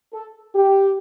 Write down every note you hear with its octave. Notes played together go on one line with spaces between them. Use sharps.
A4
G4